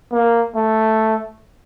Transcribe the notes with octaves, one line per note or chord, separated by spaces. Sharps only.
A#3
A3